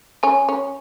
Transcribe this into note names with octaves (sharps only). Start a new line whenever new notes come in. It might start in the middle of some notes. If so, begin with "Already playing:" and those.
C#4 G#5
C#4